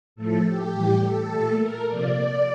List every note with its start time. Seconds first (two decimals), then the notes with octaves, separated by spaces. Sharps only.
0.16 A2 F3 A3 A4
0.45 G4
0.72 A2 E3 G3
1.01 A4
1.30 A#2 A3
1.58 A#4
1.87 C3 F3 A#3 D5